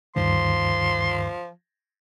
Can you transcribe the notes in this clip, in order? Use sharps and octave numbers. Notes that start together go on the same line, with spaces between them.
D2 G2 D#3 F3 C6